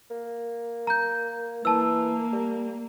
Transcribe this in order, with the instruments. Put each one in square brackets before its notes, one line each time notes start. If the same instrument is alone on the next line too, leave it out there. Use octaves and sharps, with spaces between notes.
[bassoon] A#3
[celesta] A#5 G6
[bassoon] E3 [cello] A#3 [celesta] A5 E6
[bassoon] G3